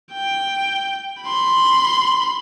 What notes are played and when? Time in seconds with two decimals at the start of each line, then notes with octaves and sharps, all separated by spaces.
0.13 G5
1.23 B5 C6